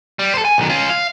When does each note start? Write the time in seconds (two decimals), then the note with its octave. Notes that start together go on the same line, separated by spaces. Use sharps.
0.19 G3
0.34 A4 C5
0.45 G#5
0.58 B1 D#3
0.69 C#4 F4
0.89 F5